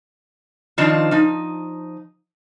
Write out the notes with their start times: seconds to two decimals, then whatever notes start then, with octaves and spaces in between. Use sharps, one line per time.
0.78 D#3 F3 C4 D4 D#4 F4
1.11 F3 D#4